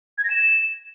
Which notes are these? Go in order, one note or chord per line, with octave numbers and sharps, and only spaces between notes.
G#6
A#6
E7